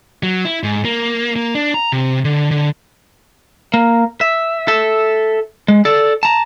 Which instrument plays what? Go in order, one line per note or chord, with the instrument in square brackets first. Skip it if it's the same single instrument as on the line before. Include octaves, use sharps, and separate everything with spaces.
[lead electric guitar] F#3
E4
G#2
A#3
A#3
D4
A#5
C3
D3
D3
A#3
E5
A4 E5
G#3
A4 D5
A5 A#5